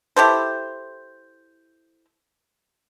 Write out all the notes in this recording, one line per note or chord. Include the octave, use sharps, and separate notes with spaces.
E4 G4 A4 C5